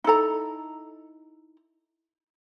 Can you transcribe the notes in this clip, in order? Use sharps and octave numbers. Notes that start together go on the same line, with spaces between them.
D#4 E4 A4 A#5